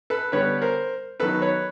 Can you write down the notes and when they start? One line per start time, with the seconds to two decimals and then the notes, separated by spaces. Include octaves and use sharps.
0.10 A4 B4
0.32 D3 G3 B3 B4 C#5
0.62 A#4 C5
1.20 D#3 F#3 B3 A4 B4
1.42 B4 C#5